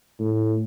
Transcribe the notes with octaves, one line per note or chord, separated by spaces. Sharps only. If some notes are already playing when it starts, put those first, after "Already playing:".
A2